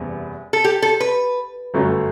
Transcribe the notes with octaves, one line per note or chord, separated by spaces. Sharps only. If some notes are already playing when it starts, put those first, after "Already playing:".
Already playing: F#1 E2 C3 G3 B3
A4
G4
A4
B4
G1 F#2 F#3 A3